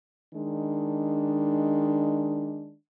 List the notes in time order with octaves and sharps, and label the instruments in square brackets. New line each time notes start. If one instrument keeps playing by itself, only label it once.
[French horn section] D#3 G#3 D4